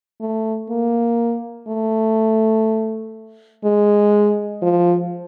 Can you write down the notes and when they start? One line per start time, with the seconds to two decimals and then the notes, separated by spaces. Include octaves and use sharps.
0.21 A3
0.70 A#3
1.68 A3
3.64 G#3
4.62 F3